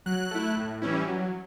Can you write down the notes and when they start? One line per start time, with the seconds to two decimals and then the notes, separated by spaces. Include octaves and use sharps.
0.06 F#3 F#6
0.31 A3 E4
0.57 A2
0.82 E3 G3 C#4 E4
1.08 F#3